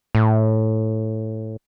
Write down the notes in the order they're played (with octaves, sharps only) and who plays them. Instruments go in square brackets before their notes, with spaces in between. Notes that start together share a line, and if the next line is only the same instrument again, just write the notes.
[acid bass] A2